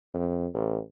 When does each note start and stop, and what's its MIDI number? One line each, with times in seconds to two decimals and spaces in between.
0.14 0.47 41
0.53 0.78 33